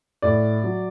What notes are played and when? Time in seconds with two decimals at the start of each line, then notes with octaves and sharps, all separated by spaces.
0.22 A2 D5
0.64 F#3